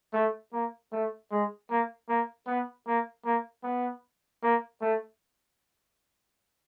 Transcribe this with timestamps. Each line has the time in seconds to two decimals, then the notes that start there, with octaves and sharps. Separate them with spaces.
0.13 A3
0.53 A#3
0.92 A3
1.31 G#3
1.70 A#3
2.08 A#3
2.47 B3
2.87 A#3
3.25 A#3
3.64 B3
4.42 A#3
4.81 A3